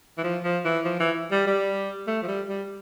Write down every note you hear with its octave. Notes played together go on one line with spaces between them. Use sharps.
E3
F3
F3
E3
F3
E3
G3
G3
A3
F3
G3
G3